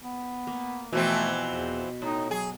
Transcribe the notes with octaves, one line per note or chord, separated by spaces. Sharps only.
B3
A#3
B2 E3 F3 A3 C4
E2
A2 D#4
F#3 G#4